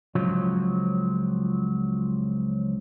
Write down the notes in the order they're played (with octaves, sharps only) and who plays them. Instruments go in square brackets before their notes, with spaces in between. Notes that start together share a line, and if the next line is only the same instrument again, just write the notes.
[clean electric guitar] C#2 F3 F#3